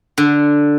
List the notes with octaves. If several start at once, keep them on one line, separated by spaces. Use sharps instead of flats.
D3